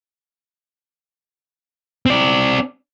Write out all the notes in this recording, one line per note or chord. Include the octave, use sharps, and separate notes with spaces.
C4 D5